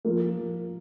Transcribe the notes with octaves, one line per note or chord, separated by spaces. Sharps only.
F3 A#3
F3